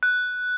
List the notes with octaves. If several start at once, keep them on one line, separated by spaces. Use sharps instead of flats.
F#6